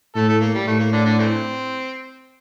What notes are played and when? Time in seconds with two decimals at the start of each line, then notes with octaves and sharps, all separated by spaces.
0.16 A2 A3 A4
0.28 A3 A4
0.41 A#3
0.55 G3
0.67 A2 A3
0.80 A#3
0.92 D3 D4
1.05 D3 D4
1.19 E3 A3 C4